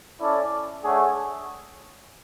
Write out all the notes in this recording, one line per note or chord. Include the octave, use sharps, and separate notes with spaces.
C#4 E4 A4 D5
A3 D4 G#4 C#5 F#5